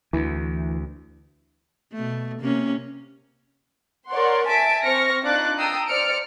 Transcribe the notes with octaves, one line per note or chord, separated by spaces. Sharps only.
D2 E3
B2 A3
C3 A#3 C#4
A#4 C#5 D5 F#5 C6
E5 G#5 A5 B6 D7
C4 C5 C#6 F6 A#6 C#7
D4 D#4 F4 D6 F#6 A6
G5 A5 A#5 D#6 E6 C7
C5 D5 F6 C#7 D7